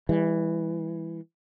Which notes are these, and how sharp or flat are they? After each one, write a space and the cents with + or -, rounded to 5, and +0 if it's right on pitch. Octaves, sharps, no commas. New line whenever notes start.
E3 +0 G3 +45